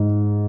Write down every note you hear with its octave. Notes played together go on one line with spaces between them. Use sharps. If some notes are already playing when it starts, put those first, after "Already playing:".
Already playing: G#2